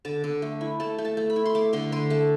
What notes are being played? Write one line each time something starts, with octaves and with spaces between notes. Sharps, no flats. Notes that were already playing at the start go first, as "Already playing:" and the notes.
D3 A5
D3
A3
E4
A3 A5
A3
A5
A3
B5
E4
C6
A3 D6
D3 C6
D3 C6
A3 A5